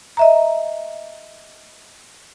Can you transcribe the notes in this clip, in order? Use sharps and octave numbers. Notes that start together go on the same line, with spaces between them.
D#5 E5 A#5